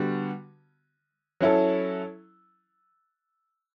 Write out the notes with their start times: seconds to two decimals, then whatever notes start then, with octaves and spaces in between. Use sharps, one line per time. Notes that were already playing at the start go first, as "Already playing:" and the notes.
Already playing: D3 G3 B3 F#4
1.41 F#3 C#4 E4 A4